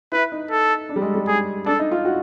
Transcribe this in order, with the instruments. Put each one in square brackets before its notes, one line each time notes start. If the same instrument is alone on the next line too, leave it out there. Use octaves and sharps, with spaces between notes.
[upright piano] E4 [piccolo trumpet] B4
[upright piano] D#4
[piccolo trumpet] A4
[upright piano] D4
G3
G#3
G3
[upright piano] G#3 [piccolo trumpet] G#4
[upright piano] D4 [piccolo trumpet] A4
[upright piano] D#4
F4
F#4